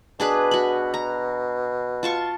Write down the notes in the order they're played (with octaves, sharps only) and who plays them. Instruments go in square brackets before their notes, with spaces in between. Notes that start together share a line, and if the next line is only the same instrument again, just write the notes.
[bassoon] B2 [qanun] D4 G#4 B4
[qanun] F#4 B5
A#5
F4 A5 C#6